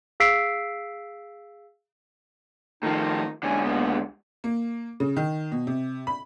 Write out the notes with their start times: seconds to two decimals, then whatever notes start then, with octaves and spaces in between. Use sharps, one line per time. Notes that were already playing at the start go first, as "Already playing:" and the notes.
0.20 G#4 F5 E6 B6 C7 D7
2.83 A2 D#3 F3 D#4
3.43 G#2 D3 C#4 G#5
3.64 C#2 A#3 B3
4.44 A#3
5.00 C#3
5.17 D#3
5.52 B2
5.67 C3
6.07 B5